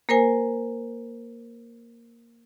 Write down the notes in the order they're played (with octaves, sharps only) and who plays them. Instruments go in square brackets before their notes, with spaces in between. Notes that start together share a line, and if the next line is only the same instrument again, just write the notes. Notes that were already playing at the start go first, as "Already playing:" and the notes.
[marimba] A#3 A#4 C5 G#5